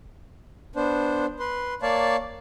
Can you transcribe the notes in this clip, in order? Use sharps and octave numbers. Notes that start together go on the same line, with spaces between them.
B3 D4 C5
B4 C6
A#3 C#5 D5 F5 A5